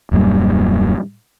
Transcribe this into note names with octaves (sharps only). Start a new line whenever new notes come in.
D#1 F#2 A#2 G3